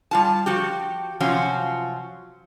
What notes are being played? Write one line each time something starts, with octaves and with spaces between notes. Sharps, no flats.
G3 F4 A5
F3 F#4 G4
C3 F3 F#3 C#4 F4 F#4